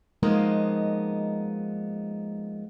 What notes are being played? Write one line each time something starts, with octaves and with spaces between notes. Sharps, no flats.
F3 G#3 A#3 B3 D#4